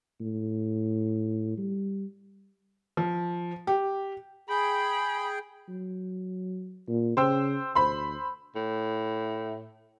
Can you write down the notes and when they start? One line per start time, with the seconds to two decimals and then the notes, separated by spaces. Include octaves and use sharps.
0.21 A2
1.57 G3
2.97 F3
3.67 G4
4.49 G#4 G5 B5
5.69 F#3
6.88 A#2
7.17 C#3 C5 G5 E6
7.75 D2 C5 B5 C6
8.56 A2